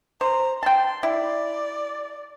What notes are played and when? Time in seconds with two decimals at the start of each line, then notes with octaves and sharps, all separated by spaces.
0.21 C5 A#5
0.63 G5 A5 C6
1.03 E4 D5